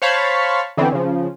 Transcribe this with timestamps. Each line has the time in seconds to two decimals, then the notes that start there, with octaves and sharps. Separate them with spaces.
0.02 C5 C#5 F5 A5 B5 C#6
0.77 D3 E3 B3 C4
0.92 C#3 F3